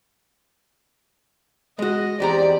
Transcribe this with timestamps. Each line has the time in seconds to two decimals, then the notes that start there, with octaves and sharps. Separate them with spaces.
1.79 G#3 F#4 D#5
2.20 E2 C4 G4 D5 A#5